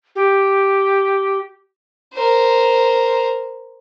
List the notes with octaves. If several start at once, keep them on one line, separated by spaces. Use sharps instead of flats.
G4
A#4 C5